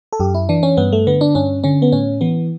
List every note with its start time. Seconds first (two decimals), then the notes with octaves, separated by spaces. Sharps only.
0.13 A4
0.20 F#2 G4
0.34 E4
0.49 E3 D4
0.63 C#4
0.77 G2 B3
0.92 A3
1.07 D3 B3
1.21 D4
1.35 G2 C#4
1.64 D3 C#4
1.82 B3
1.92 A2 C#4
2.21 E3 B3